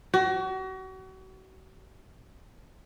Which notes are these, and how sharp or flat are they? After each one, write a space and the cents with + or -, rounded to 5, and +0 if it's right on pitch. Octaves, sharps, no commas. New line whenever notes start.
F#4 +35